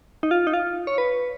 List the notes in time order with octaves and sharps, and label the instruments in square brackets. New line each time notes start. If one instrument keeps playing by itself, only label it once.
[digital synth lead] D#4
F4
D#4
F4
C#5
B4